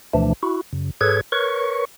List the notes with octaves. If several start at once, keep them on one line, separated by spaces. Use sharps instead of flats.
D2 B2 E3 F3 A3 D4
E4 F#4
F#2 C#3
G#2 G#4 A4 B4 C#5 G#6
A#4 B4 C#5 C#6